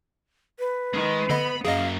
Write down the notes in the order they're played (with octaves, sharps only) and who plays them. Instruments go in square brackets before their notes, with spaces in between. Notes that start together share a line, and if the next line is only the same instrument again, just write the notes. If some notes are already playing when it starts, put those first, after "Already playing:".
[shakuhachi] B4
[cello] D#3 [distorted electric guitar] G#3
[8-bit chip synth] D3 D#5 [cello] B3 [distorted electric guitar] B5
[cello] F#2 [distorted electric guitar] F#3 A#3 [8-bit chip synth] G#4 D#5 [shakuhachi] F5